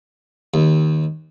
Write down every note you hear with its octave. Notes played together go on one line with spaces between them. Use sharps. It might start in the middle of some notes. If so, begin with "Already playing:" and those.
D#2